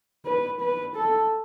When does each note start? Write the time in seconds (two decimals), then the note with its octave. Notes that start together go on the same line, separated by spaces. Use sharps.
0.26 B4
0.61 B4
0.96 A4